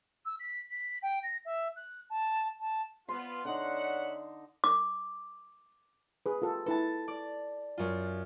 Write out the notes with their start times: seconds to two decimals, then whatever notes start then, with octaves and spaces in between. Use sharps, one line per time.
0.25 E6
0.39 B6
0.70 B6
1.02 G5
1.23 A#6
1.45 E5
1.76 F#6
2.10 A5
2.60 A5
3.09 B3 F4 C6
3.45 D3 D#4 C#5 E5 F#5
4.64 D6
6.26 G#4 B4
6.42 F4 G4 A4
6.66 E4 A4 B4 A5
7.08 D5
7.78 F#2 F4